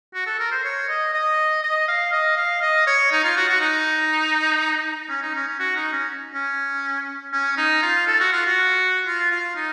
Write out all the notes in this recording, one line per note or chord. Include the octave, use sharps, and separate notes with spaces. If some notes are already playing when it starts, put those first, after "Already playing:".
F#4
A4
A#4
C5
C#5
D#5
D#5
D#5
F5
D#5
F5
D#5
C#5
D#4
F4
F#4
F#4
D#4
C#4
D#4
C#4
C#4
F#4
D#4
C#4
C#4
C#4
D#4
F4
A4
F#4
F4
F#4
F4
F4
D#4